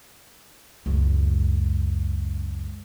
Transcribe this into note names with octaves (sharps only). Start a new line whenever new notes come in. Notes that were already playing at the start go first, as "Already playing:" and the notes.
C#2 F#2